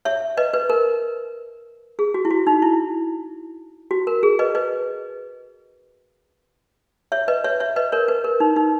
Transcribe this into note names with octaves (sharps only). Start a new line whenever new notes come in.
C#5 E5
B4 D#5
B4
A#4
G#4
F#4
E4
F#4
D#4
E4
F#4
A#4
G#4
B4 D#5
B4 D#5
C#5 E5
B4 D#5
C#5 E5
C#5 E5
B4 D#5
A#4 C#5
B4
A#4
D#4
D#4